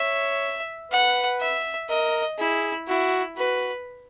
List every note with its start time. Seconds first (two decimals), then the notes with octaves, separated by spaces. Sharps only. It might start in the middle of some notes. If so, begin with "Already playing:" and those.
Already playing: C#5 E5
0.91 B4 F#5
1.40 E5
1.89 A#4 D#5
2.38 E4 G#4
2.88 E4 F#4
3.37 F#4 B4